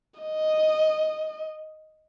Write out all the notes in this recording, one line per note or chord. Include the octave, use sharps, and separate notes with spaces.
D#5